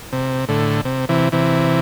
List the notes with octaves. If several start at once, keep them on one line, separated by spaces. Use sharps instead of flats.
C3
A2 D3
C3
C3 E3
C3 E3